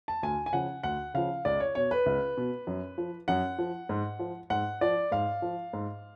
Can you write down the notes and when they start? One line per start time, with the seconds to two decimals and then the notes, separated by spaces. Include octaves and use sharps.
0.08 A5
0.23 D2 G#5
0.46 G#5
0.53 C#3 F3 F#5
0.83 D2 F#5
1.14 C#3 F3 F5
1.45 C#2 D5
1.60 C#5
1.75 B2 C#5
1.91 B4
2.06 C#2
2.37 B2
2.67 F#2
2.98 F3
3.28 F#2 F#5
3.59 F3
3.89 G#2
4.19 F3
4.50 G#2 F#5
4.81 F3 D5
5.12 G#2 F5
5.42 F3
5.73 G#2